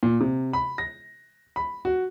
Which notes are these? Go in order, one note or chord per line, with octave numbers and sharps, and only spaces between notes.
A#2
C3
B5
A#6
B5
F#4